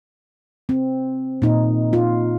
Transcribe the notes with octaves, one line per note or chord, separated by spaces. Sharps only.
C4
A#2 D#4
F4